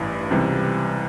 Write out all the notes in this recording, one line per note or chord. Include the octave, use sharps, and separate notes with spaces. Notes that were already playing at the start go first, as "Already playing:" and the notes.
Already playing: A1 G2 E3
C#2 C3 E3 G3